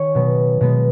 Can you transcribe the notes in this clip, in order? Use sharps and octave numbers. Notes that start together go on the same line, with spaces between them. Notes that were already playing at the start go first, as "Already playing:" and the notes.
Already playing: D#3 C#5 G#5
B2 F#3 B3
B2 G#3 B3